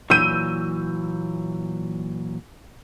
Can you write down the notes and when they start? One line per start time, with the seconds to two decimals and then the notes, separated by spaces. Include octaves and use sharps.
0.10 A#2 E3 F#3 E6 G6 D#7